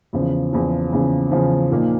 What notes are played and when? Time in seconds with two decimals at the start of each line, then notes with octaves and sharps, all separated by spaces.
0.13 E2 C#3 F3
0.53 E2 C#3 F3
0.93 E2 C#3 F3
1.31 E2 C#3 F3
1.71 A#2 F3 A#3 D#4